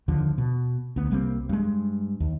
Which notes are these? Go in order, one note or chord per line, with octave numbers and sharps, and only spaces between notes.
D#2 D3 F3
B2
D2 B3
C2 G3 A#3 C4
G2 G#3
D#2